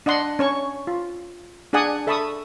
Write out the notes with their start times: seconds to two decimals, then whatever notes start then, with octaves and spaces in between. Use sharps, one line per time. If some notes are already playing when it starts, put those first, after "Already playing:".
0.06 D4 D#5 F#5 C6
0.39 C#4 C#5 C#6
0.87 F4
1.73 D4 G#4 D5 F#5 G#5 D#6
2.07 A4 E5 A5 B5 C#6 D#6